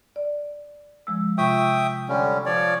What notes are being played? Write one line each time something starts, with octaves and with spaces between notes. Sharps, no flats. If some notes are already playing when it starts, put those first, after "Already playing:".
D5
F3 G#3 E6
C3 F4 E5 G5 C#6 D#6
D3 G3 C#4
F3 C#5 D5